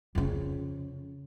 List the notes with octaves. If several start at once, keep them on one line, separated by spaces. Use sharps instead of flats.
F2 C#3